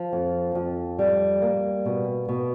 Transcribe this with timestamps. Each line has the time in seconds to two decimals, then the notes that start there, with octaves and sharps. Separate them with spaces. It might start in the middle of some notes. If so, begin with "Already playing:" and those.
Already playing: F3
0.13 F2
0.55 F2
0.99 G3
1.42 A#3
1.85 B2
2.29 B2